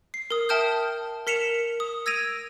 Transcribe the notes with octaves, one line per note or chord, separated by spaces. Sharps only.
C7
A#4 D#6
E5 G5 A5 D#6 F6 G6
A#4 B6 C#7 E7 F7
D#6
E6 G#6 A#6 D7 D#7 F7